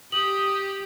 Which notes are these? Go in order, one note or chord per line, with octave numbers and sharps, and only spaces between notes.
G4 D#6 F#7